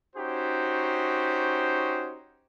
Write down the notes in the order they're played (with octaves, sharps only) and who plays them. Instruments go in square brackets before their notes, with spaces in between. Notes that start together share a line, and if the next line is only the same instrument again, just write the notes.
[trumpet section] C#4 D#4 F#4 G4 C5